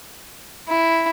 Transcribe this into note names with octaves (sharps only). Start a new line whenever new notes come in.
E4